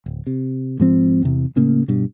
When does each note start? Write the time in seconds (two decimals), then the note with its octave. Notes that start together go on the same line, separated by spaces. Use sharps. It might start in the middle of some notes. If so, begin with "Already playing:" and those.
0.06 D1
0.27 C3
0.80 G#2 F3 C4
1.23 E2 C3 E3
1.56 A2 C#3 A#3
1.88 G2 B2